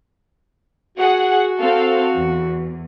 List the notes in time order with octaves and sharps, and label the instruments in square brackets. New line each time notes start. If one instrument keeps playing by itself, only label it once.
[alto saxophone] F#4 [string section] G#4 F#5
[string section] C4 A4 F5
E2